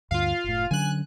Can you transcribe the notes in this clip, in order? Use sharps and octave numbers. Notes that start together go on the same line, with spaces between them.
D2 G2 D3 F4 F5
F#1 A2
D3 F#3 C#4 G#5 F#6